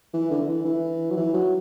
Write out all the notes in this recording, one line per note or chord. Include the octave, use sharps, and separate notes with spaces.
E3
D3
D3
E3
E3
F#3
E3
F#3